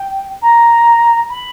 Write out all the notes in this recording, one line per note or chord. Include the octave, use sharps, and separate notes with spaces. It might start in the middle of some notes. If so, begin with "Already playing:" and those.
Already playing: G5
A#5
B5